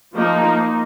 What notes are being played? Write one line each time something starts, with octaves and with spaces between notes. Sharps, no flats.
F3 A#3 D#4